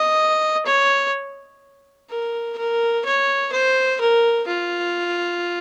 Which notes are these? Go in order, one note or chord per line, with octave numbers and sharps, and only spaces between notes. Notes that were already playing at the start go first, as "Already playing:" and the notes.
Already playing: D#5
C#5
A#4
A#4
C#5
C5
A#4
F4